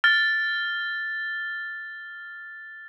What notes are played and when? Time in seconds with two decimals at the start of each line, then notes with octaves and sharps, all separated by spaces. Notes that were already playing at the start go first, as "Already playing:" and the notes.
0.04 F6 A6